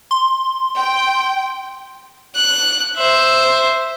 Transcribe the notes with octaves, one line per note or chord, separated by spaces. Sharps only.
C6
G5
F#6
C5 E5